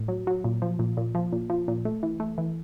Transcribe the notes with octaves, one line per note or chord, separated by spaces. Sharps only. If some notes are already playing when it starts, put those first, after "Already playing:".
Already playing: A2
F#3
F#3
A#2
F3
A#2
A#2
F3
A#2
F3
A#2
A3
E3
A3
E3